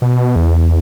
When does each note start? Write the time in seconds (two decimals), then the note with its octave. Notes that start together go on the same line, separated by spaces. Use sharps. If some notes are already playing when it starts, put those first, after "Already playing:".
0.02 B2
0.36 E2